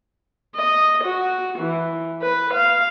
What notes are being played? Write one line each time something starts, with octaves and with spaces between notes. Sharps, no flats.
D#5
F#4
E3
B4
F5